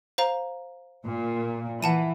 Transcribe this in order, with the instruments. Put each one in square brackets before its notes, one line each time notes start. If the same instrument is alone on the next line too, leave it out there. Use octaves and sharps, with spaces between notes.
[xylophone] C5 F5 A#5
[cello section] A#2
[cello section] E3 [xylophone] F#5 A5 D#7